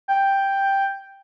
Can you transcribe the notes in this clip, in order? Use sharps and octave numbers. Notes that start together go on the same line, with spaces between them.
G5